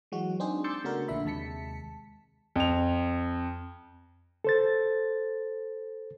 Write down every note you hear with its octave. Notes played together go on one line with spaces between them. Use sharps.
E3 F#3 G#3 F#4
C4 D4 D#4 G#4 C5
C6 D6 E6 G6 A6 C#7
C#3 A3 B3 D4 F#4 A#4
A#1 A#2 D3 D4 E5 B5
D#2 C3 G#3 A5 B6 C#7
F2 F7
A4 C5 A6